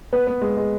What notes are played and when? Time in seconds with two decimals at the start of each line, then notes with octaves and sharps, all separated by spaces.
0.13 B3 B4
0.27 B3
0.42 G#3
0.57 G#3